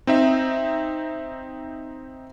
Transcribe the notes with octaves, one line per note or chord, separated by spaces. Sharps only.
C4 D#4 E5